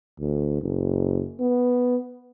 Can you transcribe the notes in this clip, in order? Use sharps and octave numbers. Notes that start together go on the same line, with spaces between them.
D2
F#1
B3